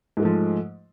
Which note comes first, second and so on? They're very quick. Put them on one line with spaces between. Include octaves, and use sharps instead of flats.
G#2 G#3 A3 F3